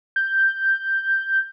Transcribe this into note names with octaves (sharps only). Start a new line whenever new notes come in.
G6